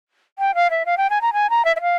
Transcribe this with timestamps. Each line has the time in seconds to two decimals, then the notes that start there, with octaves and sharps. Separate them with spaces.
0.39 G5
0.55 F5
0.70 E5
0.86 F5
0.97 G5
1.10 G#5
1.21 A#5
1.33 G#5
1.50 A#5
1.65 E5
1.76 E5
1.81 F5